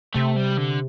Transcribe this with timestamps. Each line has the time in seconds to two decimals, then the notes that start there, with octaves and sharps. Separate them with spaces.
0.15 C3 A3
0.36 G3
0.58 D3